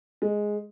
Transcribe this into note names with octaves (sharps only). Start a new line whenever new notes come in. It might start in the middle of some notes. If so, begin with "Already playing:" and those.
G#3